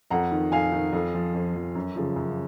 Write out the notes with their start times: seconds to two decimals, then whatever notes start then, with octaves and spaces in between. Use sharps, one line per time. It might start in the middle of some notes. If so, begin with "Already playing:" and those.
0.11 F2 F#5 A#5
0.32 D#3
0.52 F2 F5 G#5
0.72 D#3
0.93 F2
1.14 F3
1.34 F2
1.55 F3
1.75 F#2
1.96 C#3 F3
2.16 F#2